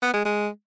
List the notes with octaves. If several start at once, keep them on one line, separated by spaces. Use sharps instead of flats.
B3
G#3
G#3